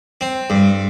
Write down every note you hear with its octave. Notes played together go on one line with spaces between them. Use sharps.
C4
G2